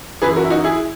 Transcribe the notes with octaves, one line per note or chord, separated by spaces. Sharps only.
F#2 E3 G#4 B4
F#4 A#4
E4
D#4 F#4
E4 G#4